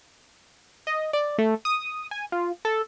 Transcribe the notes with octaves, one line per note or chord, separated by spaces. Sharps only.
D#5
D5
A3
D#6
G#5
F4
A4